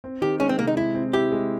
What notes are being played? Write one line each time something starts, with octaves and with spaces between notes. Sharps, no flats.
C4
D#3 G4
G#3 C#4
C4
C3 A#3
D#4
G#3 E4
C4
E4 G4
G#3